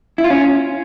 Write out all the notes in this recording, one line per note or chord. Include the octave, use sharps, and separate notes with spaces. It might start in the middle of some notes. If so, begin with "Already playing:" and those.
E4
F4
C#4